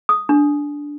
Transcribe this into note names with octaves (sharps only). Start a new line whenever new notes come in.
D#6
D4